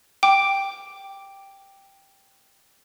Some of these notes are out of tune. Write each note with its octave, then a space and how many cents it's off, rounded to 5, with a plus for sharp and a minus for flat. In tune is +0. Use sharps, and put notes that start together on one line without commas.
G5 +0 D6 +0